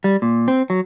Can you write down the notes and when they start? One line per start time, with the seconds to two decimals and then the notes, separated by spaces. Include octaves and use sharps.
0.04 G3
0.22 A#2
0.48 C4
0.70 F#3